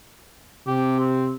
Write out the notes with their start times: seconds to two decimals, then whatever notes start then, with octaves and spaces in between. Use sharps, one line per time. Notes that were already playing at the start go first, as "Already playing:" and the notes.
0.67 C3 G4
0.99 C4